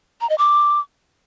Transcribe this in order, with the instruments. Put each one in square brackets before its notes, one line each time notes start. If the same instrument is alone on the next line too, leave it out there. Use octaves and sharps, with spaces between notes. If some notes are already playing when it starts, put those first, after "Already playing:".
[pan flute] A#5
D#5
D6